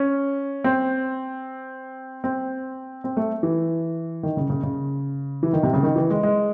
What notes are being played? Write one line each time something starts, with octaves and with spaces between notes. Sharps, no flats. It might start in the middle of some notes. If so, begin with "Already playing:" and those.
Already playing: C#4
C4
C4
C4
A3
E3
D#3
C#3
C#3
C#3
E3
D#3
C3
C#3
D#3
E3
G#3
G#3